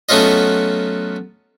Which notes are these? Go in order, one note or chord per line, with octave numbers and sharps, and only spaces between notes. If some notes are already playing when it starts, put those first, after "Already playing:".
F#3 A3 B3 C#4 F4 D#5